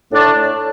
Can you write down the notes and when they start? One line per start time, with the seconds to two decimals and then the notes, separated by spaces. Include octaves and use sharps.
0.12 A2 A3 D4